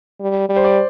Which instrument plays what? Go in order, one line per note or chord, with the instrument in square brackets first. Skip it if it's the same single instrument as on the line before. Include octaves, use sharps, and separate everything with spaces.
[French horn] G3
G3
[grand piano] C5
D5